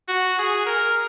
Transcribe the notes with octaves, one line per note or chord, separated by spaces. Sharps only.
F#4
G#4
A#4